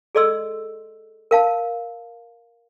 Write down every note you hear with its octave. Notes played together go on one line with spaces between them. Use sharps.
G#4 A4 D5 D#5 C6 E6
A#4 F5 A5